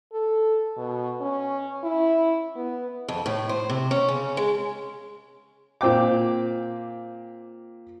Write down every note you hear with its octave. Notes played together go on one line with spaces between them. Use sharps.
A4
B2
C#4
E4
B3
F2
A2
C5
C3
C#4
C#3
G#3
A#2 C4 G5 D6